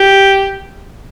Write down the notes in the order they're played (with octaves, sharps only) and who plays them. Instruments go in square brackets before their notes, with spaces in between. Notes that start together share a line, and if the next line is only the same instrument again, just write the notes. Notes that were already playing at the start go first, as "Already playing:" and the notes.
Already playing: [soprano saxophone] G4